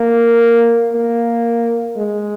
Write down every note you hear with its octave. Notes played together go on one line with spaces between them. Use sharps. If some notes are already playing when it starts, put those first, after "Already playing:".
Already playing: A#3
A#3
G#3